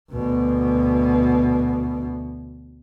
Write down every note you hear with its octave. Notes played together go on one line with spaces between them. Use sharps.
D2 B2